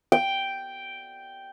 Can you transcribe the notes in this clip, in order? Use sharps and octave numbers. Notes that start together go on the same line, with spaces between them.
G5